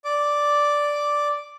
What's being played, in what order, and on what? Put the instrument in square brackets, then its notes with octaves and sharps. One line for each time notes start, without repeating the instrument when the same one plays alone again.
[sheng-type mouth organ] D5 D6